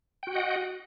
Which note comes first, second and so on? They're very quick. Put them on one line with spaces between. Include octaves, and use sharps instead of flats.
G5 F#4 F#5 D#5